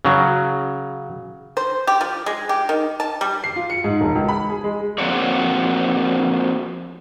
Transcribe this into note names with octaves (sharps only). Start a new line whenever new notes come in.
C#3 F#3
C5
G4
F3
G#3
G4
D#3
A5
G3
C7
F4
C#7
G#2
E1
C#2
B5
G#4
G#3
F3 A#3 C4 F#4 C#5 D5